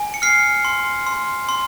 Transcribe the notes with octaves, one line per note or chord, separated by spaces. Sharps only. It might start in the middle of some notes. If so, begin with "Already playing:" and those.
Already playing: G#5
C#7
F6 C7
C6
C6
C6